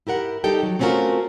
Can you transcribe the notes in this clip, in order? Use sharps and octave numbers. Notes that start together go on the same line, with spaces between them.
E4 G4 A#4 F#5
G3 D#4 G4 A4 G5
F#3
A3 C4 C#4 F4 F#4 A#4